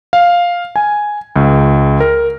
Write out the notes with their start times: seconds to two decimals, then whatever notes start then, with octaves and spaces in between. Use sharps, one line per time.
0.13 F5
0.76 G#5
1.36 C#2
2.00 A#4